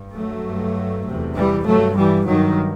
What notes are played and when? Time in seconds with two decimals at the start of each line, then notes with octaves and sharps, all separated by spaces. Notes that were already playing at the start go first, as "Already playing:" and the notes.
Already playing: G2
0.14 F#3 A3
0.45 G2
1.06 E2 C3
1.35 E3 G3
1.66 G2 F#3 A3
1.96 E3 G3
2.26 G2 D#3 F#3